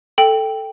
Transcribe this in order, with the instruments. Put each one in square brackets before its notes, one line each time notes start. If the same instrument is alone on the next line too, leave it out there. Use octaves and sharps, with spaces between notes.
[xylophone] A4 G5